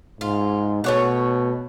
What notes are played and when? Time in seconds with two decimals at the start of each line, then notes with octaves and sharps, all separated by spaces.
0.21 G#2 F4
0.84 B2 A3 C#5 F#5